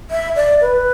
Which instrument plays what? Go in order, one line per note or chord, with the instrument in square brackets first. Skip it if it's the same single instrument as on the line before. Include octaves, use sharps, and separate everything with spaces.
[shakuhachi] E5
D5
B4